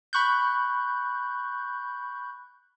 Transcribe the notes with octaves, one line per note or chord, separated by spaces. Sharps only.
B5 C#6 F#6 G6